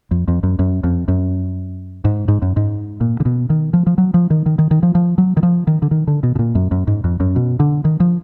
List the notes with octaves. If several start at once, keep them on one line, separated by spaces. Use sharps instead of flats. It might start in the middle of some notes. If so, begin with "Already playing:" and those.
F2
F2
F#2
F#2
F2
F#2
G#2
G#2
F#2
G#2
A#2
D3
B2
D#3
F3
F3
F#3
F3
D#3
D#3
D#3
D#3
F3
F3
F#3
D#3
F3
D#3
D3
D#3
D3
B2
B2
A#2
F#2
F#2
G#2
F2
F#2
B2
D3
D#3
F3